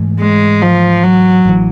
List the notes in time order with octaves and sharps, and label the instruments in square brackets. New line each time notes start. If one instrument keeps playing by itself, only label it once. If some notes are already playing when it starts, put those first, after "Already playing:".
Already playing: [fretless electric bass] G#2 E3 A3
[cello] G#3
F3
F#3
[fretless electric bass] A1 E3